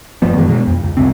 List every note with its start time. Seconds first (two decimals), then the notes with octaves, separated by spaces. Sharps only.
0.22 F#1 A2 F3 B3
0.35 F#2 D#3 E3 G#3
0.48 B2 G#3
0.67 F2
0.84 C#2
0.97 F1 C2 G#2 C4